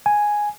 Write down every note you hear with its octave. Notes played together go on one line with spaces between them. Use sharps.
G#5